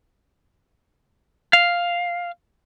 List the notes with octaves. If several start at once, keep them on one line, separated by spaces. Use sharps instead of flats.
F5